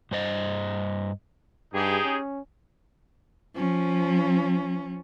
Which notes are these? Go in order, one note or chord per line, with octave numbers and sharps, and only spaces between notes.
G2 C5 D#5
G2 D#4 G4 G#4
C#4
F3 C#4